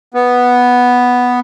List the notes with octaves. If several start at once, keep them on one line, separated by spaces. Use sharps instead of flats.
B3